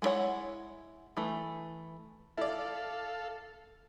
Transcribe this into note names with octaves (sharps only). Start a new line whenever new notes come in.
G#3 B3 E4 C#5 F#5
E3 A3
E4 A4 D5 F5